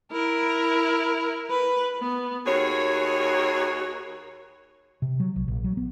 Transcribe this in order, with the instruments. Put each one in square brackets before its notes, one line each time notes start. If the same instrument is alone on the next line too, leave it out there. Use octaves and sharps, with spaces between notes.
[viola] E4 A#4
B4
B3
[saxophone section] D#2 F#4 G#4 C#5
[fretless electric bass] C3
F#3
B1
A#1
F#3
B3